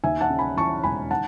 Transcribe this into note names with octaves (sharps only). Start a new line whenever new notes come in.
D#2 E5 G#5
F#5 A5
C#3
G#5 B5
E3 A5 C#6
E1 G#5 B5
D#3 F#5 A5